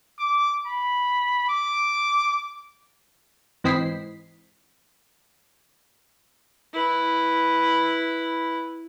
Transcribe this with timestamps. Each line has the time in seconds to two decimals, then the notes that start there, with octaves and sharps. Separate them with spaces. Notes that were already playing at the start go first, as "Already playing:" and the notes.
0.19 D6
0.67 B5
1.49 D6
3.64 G#2 E3 C4 D#5 B6 C7
6.73 E4 B4